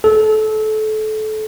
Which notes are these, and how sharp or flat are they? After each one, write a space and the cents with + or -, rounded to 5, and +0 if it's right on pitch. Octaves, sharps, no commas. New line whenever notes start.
A4 -25